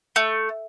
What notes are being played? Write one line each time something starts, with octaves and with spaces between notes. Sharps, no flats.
A3